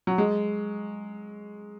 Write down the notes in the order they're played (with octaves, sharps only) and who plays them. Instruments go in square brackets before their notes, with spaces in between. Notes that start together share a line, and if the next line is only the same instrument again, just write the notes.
[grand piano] F#3
G#3